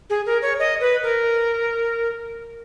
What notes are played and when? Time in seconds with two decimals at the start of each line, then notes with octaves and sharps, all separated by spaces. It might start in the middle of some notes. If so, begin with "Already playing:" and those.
0.10 G#4
0.26 A#4
0.42 C#5
0.59 D#5
0.81 B4
1.03 A#4